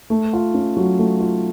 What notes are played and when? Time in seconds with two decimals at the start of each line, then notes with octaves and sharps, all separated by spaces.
0.10 A3
0.33 F4
0.54 C#4
0.77 F#3
0.99 A3
1.20 F4